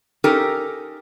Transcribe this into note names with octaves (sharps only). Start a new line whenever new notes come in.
C#4 D#4 G4 A4 A#4